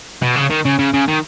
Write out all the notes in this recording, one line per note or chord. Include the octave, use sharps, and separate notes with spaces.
B2
C#3
D#3
C#3
C#3
C#3
D#3